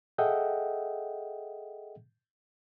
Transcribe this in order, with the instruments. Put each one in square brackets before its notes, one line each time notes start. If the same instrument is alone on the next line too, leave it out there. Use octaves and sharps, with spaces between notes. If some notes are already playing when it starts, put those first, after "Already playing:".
[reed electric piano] G#4 A4 D#5 E5 F#5 G5